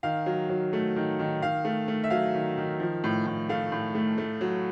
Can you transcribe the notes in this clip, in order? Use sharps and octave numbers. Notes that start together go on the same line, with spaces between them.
D#3 F5
F#3
F#3
A3
D#3
D#3
D#3 F5
A3
A3
E5
F#3 F5
D#3
D#3
F3
A2
A2
A3 F5
A2
A3
A3
F#3